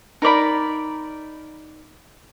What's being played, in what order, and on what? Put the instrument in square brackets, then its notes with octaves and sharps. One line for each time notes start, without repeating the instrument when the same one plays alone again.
[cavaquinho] D#4 A#4 D5 B5